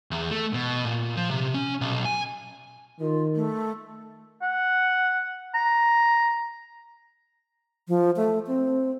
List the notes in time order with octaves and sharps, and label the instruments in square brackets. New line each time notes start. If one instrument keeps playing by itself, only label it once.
[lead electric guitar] E2
A3
B2
A#2
F3
C3
C#4
B1
G#5
[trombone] D#3 [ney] F4
[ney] A3
[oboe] F#5
A#5
[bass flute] F3
A3
C4